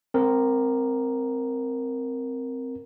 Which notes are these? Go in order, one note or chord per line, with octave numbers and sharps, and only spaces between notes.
C4 A#4